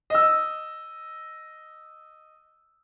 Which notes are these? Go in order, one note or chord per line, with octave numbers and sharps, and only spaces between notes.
D#5 E6